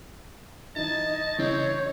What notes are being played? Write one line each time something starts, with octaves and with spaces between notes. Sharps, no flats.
E3 D#4 E4 D#5 A5
C#3 E3 C4 C#5